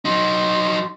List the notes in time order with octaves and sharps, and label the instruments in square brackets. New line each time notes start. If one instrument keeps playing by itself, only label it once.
[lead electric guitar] F#3 D#4 [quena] C6